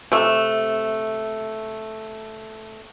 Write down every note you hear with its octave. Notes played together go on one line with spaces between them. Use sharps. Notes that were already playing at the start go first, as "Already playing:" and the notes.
C3 A3